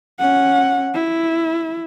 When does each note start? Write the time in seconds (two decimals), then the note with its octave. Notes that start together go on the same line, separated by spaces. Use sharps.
0.20 C#4 F#5
0.94 E4